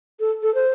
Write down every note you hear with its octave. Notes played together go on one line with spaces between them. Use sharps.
A4
A4
C5